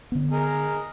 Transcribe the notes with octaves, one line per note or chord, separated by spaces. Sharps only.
D3 B3
G#4 A#4 D#5